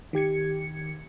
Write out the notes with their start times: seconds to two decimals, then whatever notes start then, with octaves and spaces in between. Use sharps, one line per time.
0.13 D#3 G4 G#6 C#7